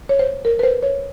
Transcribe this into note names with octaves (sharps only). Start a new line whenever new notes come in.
C#5
C5
A#4
B4
C5
C#5